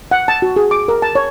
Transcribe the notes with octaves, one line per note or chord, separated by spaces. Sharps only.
F#5
A5
F#4
G#4
D6
A#4
A5
C#5